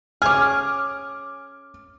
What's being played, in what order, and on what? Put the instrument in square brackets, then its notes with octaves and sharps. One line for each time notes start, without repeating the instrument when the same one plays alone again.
[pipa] C#4 G#4 [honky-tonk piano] D6 F6